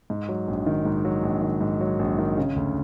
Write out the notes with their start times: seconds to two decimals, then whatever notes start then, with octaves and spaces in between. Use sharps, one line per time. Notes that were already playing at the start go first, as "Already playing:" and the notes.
0.10 G#2
0.29 F#3
0.48 A#1
0.66 D#3
0.85 G#2
1.05 F#3
1.23 A#1
1.42 D#3
1.61 G#2
1.81 F#3
1.99 A#1
2.19 D#3
2.37 C#3
2.56 D2